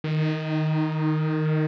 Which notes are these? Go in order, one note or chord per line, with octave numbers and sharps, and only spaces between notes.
D#3